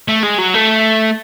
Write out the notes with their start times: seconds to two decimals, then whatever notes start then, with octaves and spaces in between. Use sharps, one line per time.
0.08 A3
0.23 G#3
0.38 F#3
0.54 A3